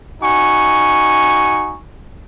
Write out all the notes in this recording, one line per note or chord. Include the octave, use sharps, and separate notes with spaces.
D#4 F#4 G#5 C#6